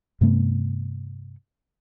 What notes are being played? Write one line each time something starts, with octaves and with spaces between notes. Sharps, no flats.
G2 C3 A3 B3